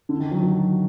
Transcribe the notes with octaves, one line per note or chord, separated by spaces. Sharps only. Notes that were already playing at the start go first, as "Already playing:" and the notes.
D3
D#3
F#3
F#3